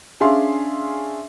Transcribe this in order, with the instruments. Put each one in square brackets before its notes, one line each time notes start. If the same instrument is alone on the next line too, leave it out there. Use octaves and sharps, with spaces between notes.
[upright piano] C#4 D4 G#4 E5 F5 C6